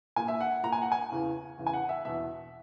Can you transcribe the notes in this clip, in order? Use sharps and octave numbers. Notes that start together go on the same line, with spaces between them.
A#2 G#5
E5
F#5
A#2 A#5
G#5
F#5
G#5
E2 C#3 E3
E2 C#3 E3
G#5
F#5
E5
E2 B2 E5